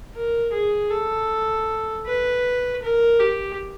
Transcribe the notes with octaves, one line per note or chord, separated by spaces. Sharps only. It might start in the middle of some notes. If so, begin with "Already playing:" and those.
A#4
G#4
A4
B4
A#4
G4